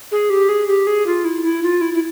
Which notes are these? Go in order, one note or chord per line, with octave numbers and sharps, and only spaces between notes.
G#4
G4
G#4
G4
G#4
F4
E4
E4
F4
E4
E4